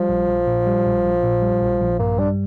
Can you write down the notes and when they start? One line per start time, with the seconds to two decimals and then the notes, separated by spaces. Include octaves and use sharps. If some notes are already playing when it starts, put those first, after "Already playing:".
Already playing: F3 G3
0.09 A#1
0.28 A#1
0.47 A#2
0.67 G3
0.86 A#1
1.05 A#1
1.24 A#2
1.42 G3
1.61 A#1
1.81 A#1
1.99 G2 A#3
2.18 G3 D4